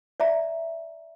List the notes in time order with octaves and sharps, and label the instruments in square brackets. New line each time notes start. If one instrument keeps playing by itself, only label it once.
[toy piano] D5 E5 A#5